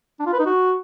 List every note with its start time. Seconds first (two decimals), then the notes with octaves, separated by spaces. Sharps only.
0.19 D4
0.26 F4
0.33 B4
0.39 D#4
0.46 F#4